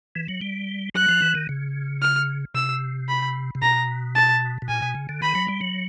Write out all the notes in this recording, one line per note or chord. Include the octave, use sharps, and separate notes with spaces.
E3
F#3
G3
F#3 F#6
F3
E3
D#3
C#3
F6
C3 E6
B5
C3
B2 A#5
A5
B2
A#2 G#5
B2
C#3
D3
D#3 B5
F#3
G3
F#3